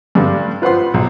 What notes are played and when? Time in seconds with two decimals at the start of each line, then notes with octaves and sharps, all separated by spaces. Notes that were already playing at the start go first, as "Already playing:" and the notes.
0.15 G2 D3 G3
0.62 F4 B4 C5 F#5 C6
0.94 B1